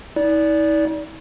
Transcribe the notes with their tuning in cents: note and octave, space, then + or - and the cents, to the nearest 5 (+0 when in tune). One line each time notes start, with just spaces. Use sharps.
D#4 +45 D5 -20